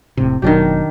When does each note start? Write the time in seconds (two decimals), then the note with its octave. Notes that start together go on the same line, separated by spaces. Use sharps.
0.17 E1 A2 C3
0.42 F1 B2 D#3 F#3 D4 G4